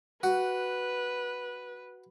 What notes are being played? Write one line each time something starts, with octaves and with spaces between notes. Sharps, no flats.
F#4 B4